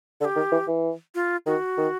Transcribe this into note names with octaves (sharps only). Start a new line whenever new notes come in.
D3 A4
G4
D#3
E3
E3
F4
D#3 F#4
D#3